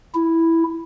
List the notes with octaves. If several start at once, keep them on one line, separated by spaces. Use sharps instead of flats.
E4